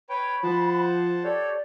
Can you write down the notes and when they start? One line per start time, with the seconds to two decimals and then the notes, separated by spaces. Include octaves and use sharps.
0.09 B4 C#5 G5 B5
0.43 F3 C5 F#5 A5
1.24 G4 A4 C#5 D5